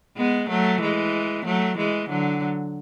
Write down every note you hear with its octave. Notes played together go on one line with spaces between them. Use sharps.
G#3 B3
F#3 A3
E3 G#3
F#3 A3
E3 G#3
D3 F#3